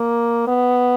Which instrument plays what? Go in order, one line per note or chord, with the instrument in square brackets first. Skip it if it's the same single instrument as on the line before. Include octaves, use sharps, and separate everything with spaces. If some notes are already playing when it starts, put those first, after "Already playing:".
Already playing: [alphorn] A#3
B3